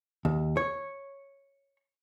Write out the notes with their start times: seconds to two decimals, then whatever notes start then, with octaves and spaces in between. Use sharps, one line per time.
0.25 D#2
0.57 C#5